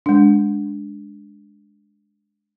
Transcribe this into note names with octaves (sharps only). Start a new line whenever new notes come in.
G#3 D4